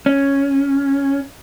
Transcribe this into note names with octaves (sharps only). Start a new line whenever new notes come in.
C#4